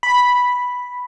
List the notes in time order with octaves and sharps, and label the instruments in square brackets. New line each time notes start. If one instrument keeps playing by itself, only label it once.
[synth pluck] B5